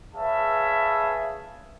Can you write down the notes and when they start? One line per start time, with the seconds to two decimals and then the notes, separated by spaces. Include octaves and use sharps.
0.15 G#4 B4 C#5 E5 F5 A5